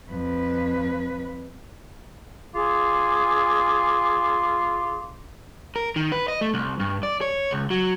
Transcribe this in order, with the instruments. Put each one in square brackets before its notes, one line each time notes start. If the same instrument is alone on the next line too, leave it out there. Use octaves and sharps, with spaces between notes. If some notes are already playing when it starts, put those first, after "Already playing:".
[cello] F2 B4
[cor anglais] F4 [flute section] G#4 D6
[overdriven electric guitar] A#4
D#3
B4
D#5
A3
C2
G2
D5
C#5
C#2
F#3